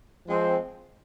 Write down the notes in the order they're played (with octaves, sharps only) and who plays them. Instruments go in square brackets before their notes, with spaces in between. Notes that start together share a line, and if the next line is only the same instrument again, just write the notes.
[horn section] F3 G#3 C4